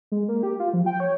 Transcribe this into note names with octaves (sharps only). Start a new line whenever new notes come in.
G#3
A#3
G4
F4
F3
G5
C#5